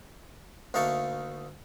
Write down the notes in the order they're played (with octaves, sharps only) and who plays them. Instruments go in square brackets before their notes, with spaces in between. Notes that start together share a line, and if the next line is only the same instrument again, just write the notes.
[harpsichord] D2 A#3 D#4 F5 A5 C#6